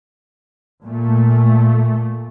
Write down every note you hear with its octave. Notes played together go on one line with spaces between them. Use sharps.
A#2 A3